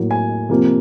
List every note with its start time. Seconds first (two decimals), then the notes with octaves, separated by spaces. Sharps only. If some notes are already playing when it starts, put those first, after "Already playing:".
Already playing: A2 F#3 A#3
0.11 G#5
0.49 C3 F3 A#3